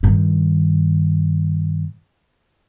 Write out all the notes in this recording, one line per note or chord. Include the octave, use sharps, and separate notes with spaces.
G2 D#3